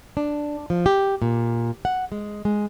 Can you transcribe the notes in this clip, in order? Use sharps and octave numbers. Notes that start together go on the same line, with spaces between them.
D4
F3
G4
A#2
F#5
G#3
G#3